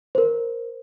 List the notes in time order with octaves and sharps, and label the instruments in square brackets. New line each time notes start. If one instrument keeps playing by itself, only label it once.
[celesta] A#4 C5